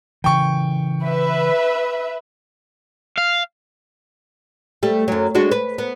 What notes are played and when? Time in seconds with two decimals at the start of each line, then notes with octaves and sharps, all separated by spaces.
0.24 C#3 E3 G5 C#6
1.04 B4 E5
3.18 F5
4.83 G3 A3
5.08 F#2 F#3
5.35 G#3 D4 F#4
5.51 B4
5.78 B3